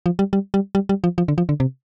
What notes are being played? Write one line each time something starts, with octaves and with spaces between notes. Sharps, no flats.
F3
G3
G3
G3
G3
G3
F3
F3
D3
F3
D3
C3